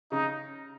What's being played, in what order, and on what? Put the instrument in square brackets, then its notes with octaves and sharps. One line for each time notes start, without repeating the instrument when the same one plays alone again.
[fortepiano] C#3 [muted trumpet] D#4